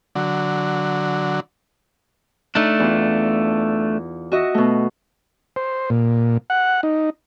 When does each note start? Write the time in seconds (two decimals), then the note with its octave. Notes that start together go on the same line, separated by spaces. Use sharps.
0.15 D3 F#3
2.55 A3 D4 D#4
2.79 E2 F4
4.32 F#4 D#5 E5
4.54 B2 A3
5.56 C5
5.90 A#2
6.50 F#5
6.83 D#4